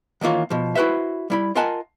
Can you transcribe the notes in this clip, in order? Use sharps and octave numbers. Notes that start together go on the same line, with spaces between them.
D#3 E3 A#3 F4 C#5
B2 F3
E4 F#4 B4 C5 E5
G3 E4 B5
F4 A#4 D#5 F#5 G#5 A5